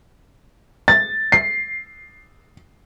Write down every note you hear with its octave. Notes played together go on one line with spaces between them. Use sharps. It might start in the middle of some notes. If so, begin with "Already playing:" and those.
A6
C7